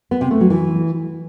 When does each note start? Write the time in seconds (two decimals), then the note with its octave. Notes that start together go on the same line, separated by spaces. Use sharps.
0.11 B3
0.21 C3
0.31 A3
0.41 F#3
0.50 E3